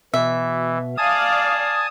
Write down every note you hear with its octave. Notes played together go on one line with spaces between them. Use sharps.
B2 E3 E5
D5 F5 G#5 A5 D#6